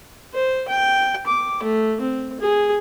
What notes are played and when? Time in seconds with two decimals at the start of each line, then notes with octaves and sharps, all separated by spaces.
0.34 C5
0.68 G5
1.27 D6
1.63 A3
2.01 C4
2.40 G#4